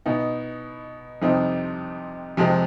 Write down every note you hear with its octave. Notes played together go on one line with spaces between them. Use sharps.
B2 B3 D#4
F2 C3 G3 C4 D#4
F2 C3 F3 G#3 C4